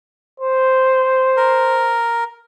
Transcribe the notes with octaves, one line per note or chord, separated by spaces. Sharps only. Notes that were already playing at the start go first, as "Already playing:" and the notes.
C5
A#4